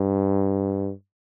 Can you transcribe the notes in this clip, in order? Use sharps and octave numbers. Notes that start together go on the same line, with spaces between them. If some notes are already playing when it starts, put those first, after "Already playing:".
Already playing: G2